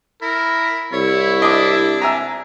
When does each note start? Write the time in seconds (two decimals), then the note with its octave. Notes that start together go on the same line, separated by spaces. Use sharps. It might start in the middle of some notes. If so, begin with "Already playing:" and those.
0.22 E4 A#4
0.93 C2 E4 C#5
1.42 D4 D#5 D6
2.01 E5 G#5 A#5